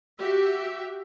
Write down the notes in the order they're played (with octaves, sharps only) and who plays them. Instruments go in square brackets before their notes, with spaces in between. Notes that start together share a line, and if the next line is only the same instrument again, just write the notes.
[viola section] F#4 G4 E5